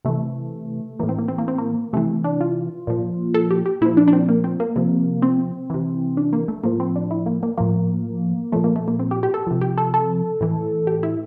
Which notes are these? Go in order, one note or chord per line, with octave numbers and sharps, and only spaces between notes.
C3 E3 A3
A2 E3 A#3
C4
A#3
C4
A#3
C4
A#3
C3 E3 A3
D4
F4
A#2 F3
A4
G4
G4
A#2 F3 E4
D4
D4
C4
A#3
C4
A#3
C3 F3
C4
C3 E3
D4
A#3
A3
A2 F3 A#3
C4
D4
E4
A#3
A#3
A2 F3 A#3
A#2 F3 A3
A#3
A3
A#3
C4
G4
G4
A4
C3 F3
G4
A4
A4
A2 E3
G4
E4